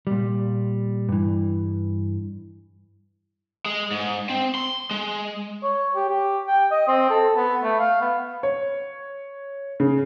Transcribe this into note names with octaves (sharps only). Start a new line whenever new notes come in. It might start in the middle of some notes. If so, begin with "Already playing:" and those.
A#2 G3
G2 E3
G#3
G#2
C4
C6
G#3
C#5
G4
G4
G5
D#5
C4
A4
B3
A3
F5
B3
C#5
C#3